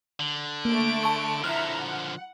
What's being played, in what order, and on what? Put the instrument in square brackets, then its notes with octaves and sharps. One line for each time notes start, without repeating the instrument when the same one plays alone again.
[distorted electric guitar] D3
[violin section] A3 D7 [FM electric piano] A#3
[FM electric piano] A5 C#6
[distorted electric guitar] D3 F3 [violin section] E4 E5 A#5 [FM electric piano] F6 F#6 C#7
[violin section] F#5